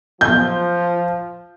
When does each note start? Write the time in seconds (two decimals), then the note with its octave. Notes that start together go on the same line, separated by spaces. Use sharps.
0.21 F3 G6